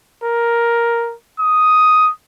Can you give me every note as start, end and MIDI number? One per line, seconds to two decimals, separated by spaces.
0.24 1.14 70
1.40 2.11 87